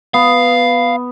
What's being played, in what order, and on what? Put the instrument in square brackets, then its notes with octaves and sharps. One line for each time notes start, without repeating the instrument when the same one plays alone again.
[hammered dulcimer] B3 [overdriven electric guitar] F5